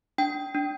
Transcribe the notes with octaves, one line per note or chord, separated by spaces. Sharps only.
D4 G5
D4